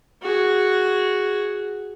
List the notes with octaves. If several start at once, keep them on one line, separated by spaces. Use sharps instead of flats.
F#4 G#4